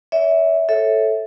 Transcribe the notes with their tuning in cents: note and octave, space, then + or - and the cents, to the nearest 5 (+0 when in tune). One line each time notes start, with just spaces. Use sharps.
C#5 +40 E5 -15
A4 +0 C#5 -10 E5 -15